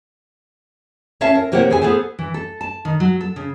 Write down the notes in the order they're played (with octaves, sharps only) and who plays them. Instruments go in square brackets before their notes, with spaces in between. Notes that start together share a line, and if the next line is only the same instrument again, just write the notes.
[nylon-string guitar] C#4 C#5 E5 F5 A5
A#4
C3 A#3 G4 A#4 C#5 F#5
E3 G#4 C#5 G#5
B3 G#4 A4 C5
E3
A4
A5
D#3
F#3
A4
C#3